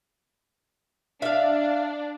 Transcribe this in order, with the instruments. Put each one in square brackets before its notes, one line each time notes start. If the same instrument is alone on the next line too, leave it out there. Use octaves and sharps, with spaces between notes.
[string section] D4 [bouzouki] E5 F5